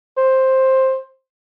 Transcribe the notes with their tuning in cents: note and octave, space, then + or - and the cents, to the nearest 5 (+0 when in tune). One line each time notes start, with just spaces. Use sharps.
C5 +10